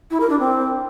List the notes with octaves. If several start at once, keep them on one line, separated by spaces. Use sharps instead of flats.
E4
A#4
D4
C4